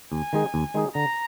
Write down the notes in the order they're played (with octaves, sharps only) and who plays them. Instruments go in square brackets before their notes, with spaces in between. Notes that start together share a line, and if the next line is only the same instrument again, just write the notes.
[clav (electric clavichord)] D#2 [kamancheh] G#5
[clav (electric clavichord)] D#3 G#3 D#4 G#4
D#2
D#3 G#3 D#4 G#4
[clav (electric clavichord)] D3 [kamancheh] A#5